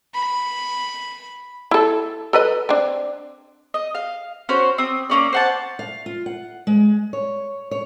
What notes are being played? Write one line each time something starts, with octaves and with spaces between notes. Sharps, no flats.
B5
E4 A4
A4 B4 D#5
C4 D4
D#5
F5
C#4 F#4 C5
C4 D#6
A#3 C#4 D5
C5 F#5 A5
F5
F4
F#5
G#3
C#5
C#5